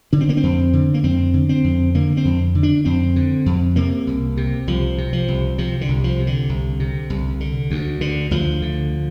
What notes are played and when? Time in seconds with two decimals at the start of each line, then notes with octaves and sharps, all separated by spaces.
0.13 D3 D4
0.21 C4
0.29 A#3
0.37 C4
0.43 F2
0.73 D3
0.94 A#3
1.04 F2 C4
1.34 D3
1.49 C4
1.64 F2
1.94 D3 A#3
2.17 C4
2.25 F2
2.55 D3
2.63 D4
2.85 F2 C4
3.16 D3
3.46 F2
3.76 C3 A#3
4.07 C2
4.37 C3
4.67 C2 F3
4.98 C3
5.13 F3
5.28 C2
5.58 C3 F3
5.81 D3
5.89 C2
6.04 F3
6.19 C3
6.27 D3
6.49 C2
6.80 C3
7.10 C2
7.40 D3
7.71 D2
8.01 D3
8.31 D2 F3
8.62 D3